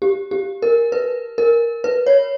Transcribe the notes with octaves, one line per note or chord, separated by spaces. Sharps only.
G4
G4
A#4
B4
A#4
B4
C#5